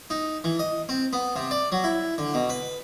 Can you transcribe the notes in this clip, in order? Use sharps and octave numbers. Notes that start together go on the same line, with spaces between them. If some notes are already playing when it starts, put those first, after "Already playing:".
D#4
E3
D#5
C4
B3
C3
D5
F#3
E4
D3
B2
B4